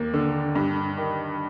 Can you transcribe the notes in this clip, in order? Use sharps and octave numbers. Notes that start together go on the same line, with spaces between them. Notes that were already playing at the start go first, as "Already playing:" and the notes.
Already playing: D#2 A#3
D3
G2
D#3